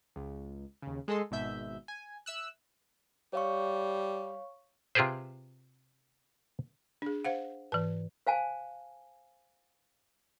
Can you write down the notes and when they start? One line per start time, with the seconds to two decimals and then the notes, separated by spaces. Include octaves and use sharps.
0.16 C#2
0.82 D#2 C#3
1.08 G#3 G#4 A4 D#5 C6
1.31 G#1 G#2 B2 E5 G6
1.88 G#5
2.26 E5 E6 F#6
3.33 G3 C#5 F5 C#6
4.95 C3 F4 G4 G#4 B4 C5
7.02 D4 G#4
7.24 C5 F5 F#5
7.72 G#2 E3 B4
8.27 C5 F5 G#5 A5